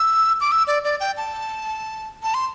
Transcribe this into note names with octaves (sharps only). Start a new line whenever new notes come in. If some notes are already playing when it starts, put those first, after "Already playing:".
Already playing: E6
D6
E6
D5
D5
G5
A5
A5
C6